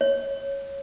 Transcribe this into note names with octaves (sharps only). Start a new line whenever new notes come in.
C#5